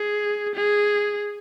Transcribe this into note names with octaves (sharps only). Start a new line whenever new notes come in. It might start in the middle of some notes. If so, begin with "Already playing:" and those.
Already playing: G#4
G#4